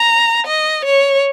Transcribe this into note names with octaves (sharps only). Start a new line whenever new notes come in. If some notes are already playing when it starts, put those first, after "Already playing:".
Already playing: A#5
D#5
C#5